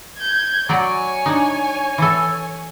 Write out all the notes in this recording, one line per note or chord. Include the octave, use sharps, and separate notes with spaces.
G6 G#6
F#3 F#4 C#5 D5 G#5
D4 D#4
E3 A4